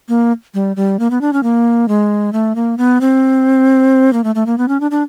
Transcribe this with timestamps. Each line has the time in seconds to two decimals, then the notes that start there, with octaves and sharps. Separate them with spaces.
0.09 A#3
0.54 G3
0.76 G3
0.99 A#3
1.11 B3
1.21 D4
1.33 C#4
1.43 A#3
1.88 G#3
2.33 A3
2.55 A#3
2.78 B3
3.01 C4
4.13 A#3
4.24 A3
4.35 A3
4.46 A#3
4.58 B3
4.68 C#4
4.80 D4
4.91 D4